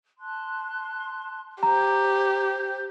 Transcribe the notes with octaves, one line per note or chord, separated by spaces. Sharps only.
A5 C6 F#6
G4 C5 A#5 G6